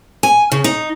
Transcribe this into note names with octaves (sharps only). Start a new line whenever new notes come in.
G#5
C#3
D#4